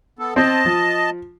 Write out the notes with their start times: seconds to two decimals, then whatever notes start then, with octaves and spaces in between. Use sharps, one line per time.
0.19 B3 A4
0.36 C4 C5 D#5 A5
0.66 F3